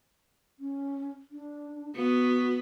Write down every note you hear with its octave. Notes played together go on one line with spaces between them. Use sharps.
C#4
D4
B3 F#4